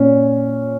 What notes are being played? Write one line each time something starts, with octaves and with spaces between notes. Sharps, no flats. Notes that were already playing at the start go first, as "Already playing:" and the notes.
Already playing: A#2 C#4